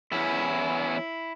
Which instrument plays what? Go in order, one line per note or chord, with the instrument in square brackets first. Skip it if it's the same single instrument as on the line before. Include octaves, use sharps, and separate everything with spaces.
[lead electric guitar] E2 C#4 [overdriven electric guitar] E4